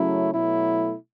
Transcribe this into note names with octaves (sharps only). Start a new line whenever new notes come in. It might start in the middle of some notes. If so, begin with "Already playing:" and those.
Already playing: C#3 F#3 A3 C#4 E4
B2 F#3 A3 E4